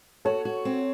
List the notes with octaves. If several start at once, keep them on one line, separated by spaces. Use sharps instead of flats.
F#4 A4 C#5
F#4
C4